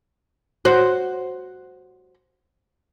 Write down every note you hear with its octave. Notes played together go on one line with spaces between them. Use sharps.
F#4 C5